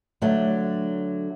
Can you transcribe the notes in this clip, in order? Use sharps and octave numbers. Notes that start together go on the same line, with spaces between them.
D3 F#3 A3